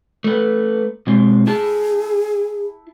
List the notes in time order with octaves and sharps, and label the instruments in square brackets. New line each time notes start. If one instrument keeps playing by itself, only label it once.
[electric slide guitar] A3 B4
B2 G#3 C4
[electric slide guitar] E4 A5 [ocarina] G#4